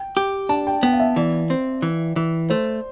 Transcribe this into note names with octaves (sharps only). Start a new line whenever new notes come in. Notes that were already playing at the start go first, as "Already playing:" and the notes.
Already playing: G5
G4
D4 A5
G5
B3 G5
F5
E5
E3 D5
C4
E3
E3
A3 C5